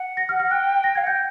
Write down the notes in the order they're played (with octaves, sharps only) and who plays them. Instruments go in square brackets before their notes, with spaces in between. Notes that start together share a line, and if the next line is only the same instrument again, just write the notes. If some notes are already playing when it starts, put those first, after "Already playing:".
Already playing: [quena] F#5
[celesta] A#6
F6
F6
[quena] G5 [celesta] F#6
[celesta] A#6
[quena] F5 [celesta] G#6
[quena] F#5
[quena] G5 [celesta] G6